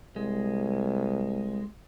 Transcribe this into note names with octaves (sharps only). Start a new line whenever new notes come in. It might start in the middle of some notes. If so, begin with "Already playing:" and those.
C2 G#3